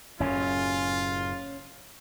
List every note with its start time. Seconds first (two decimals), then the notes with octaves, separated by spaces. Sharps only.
0.20 F#1 F#2 A2 C#4 F4